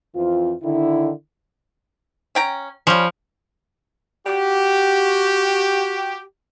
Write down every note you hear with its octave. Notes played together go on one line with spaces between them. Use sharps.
F2 E3 C4 F4
D3 D#3 E4
C#4 G5 A#5
F3 G3 C#4
F#4 G4